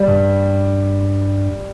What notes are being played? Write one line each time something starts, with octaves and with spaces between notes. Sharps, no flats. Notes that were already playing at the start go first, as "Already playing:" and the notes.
Already playing: G3
G2